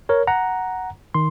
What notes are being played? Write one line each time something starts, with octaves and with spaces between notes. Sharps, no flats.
A#4 C#5
F#5 A#5
D#3 C6